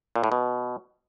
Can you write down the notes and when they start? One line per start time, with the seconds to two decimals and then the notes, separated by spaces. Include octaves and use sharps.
0.16 A#2
0.24 A2
0.32 B2